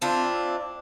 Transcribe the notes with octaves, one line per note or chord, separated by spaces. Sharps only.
C4 D4 E4 F4